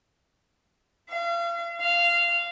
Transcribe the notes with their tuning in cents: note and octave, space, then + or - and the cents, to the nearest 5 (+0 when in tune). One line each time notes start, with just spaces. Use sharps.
F5 -40
F5 -15